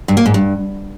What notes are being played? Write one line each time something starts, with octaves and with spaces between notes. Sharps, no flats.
G2
A#3
G#2
G2